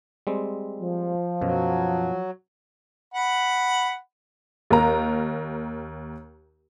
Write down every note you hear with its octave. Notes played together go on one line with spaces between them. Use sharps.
G3 G#3 C4
F3
F#2 B2 F#3
F#5 B5
D#2 A#4 A#5